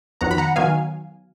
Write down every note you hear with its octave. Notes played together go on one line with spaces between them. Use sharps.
F2 D#3 F#3 B3 F#5 A#5
B5
F#5 A#5
D#3 F#3 B3 F5 G#5